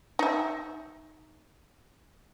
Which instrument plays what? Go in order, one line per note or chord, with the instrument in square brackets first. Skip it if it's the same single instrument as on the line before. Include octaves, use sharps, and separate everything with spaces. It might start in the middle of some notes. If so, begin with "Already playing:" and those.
[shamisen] D#4 E5